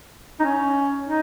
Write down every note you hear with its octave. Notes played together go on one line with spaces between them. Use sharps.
D#4
C#4
D#4